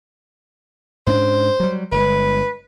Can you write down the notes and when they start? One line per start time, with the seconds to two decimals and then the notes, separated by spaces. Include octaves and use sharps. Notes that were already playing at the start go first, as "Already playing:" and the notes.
1.07 G#2 C#4 D4 C5
1.60 F#3 G3
1.92 G1 G#3 B4